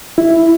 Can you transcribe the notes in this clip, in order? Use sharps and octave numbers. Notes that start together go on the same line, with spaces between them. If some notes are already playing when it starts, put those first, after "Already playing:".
E4